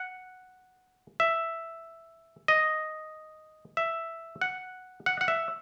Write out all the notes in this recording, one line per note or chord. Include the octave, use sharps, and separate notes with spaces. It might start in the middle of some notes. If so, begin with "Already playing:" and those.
Already playing: F#5
E5
D#5
E5
F#5
F#5
F#5
E5